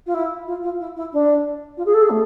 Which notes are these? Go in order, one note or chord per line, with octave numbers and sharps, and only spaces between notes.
F4
E4
F4
F4
E4
E4
D4
F4
G#4
A4
G#4
A3